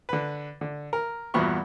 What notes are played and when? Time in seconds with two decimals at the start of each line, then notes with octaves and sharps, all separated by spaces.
0.09 D3 B4
0.61 D3
0.93 A#4
1.34 E2 G2 A#2 B3 F#4 C#6